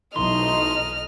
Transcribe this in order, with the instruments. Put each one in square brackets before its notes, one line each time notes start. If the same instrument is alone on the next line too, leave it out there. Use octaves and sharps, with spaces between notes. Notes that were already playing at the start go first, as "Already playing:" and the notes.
[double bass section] B1 [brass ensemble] E3 A3 D#4 [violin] D#5 F6 [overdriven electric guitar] C6